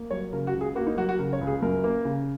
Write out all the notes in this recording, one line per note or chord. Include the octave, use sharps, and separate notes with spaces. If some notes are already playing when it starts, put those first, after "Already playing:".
Already playing: A#3
F#3 C#5
C#3 A#4
F#4
C#2
G#4
A#3 F#4
D#4
F#3 F#4
F#4
C#3 A#4
C#5
C#2
G#4
F#2 A#4
A#3
C#3